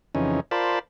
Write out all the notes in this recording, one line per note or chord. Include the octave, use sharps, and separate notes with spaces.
F2 C#3 E3 C#4 D#4
F4 A#4 C5 D5 A5 B5